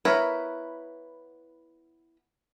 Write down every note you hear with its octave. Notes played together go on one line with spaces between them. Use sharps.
B3 E4 A#4 B4 C#5